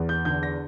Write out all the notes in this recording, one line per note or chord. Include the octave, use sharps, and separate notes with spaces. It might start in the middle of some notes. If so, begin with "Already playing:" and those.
Already playing: E2
G6
D3 G6
A#6